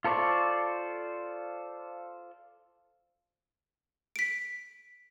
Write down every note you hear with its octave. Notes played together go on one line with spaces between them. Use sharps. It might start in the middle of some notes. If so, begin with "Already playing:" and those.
F4 A4 C5 D5 C#6
B6 D7